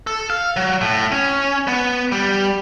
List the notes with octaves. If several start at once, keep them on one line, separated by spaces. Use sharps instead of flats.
A4
F5
F#3
A2
C#4
B3
G3